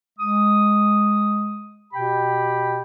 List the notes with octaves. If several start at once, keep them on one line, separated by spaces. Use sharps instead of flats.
G#3 D#6
B2 G4 G5 B5